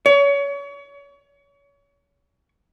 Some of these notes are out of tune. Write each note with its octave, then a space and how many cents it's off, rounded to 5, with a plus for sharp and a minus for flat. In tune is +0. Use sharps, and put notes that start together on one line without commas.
C#5 +30